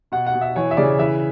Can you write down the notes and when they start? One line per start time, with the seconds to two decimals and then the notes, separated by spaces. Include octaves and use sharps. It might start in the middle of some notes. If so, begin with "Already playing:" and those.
0.12 B2 F#5
0.27 F#5
0.34 B2
0.41 E5
0.56 E3 C#5
0.71 E5
0.77 C#3 D5
0.99 E3 E5